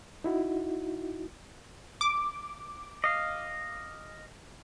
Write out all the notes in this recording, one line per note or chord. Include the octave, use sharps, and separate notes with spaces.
D#4 E4 F#4
D6
D#5 F5